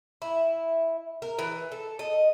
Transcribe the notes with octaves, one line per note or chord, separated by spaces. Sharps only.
E4
A#4
E3
A4
D#5